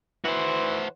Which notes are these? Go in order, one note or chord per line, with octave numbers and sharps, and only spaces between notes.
E3 F#4 C5